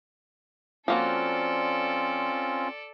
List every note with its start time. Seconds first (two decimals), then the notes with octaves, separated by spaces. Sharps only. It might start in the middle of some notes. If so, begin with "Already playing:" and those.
0.88 F3 A#3 C4 C#4 F4 F#4 A4 D5